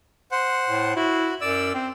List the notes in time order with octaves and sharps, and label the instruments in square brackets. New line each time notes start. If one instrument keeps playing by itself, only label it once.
[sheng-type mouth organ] C5 F#5
[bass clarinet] A2
[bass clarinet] E4 [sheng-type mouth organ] F#4
[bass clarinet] F#2 [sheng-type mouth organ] D5 E6
[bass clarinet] C4